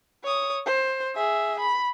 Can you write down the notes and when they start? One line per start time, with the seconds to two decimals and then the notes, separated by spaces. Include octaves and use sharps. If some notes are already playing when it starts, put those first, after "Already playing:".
0.24 C#5 D#6
0.66 C5
1.15 G#4 E5
1.60 B5